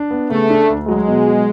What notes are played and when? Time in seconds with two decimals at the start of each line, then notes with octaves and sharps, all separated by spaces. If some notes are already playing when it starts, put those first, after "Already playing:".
Already playing: D4
0.11 B3
0.30 C#3 A3
0.50 D4
0.70 D2
0.88 F#3 G#3
1.08 B2
1.27 F#3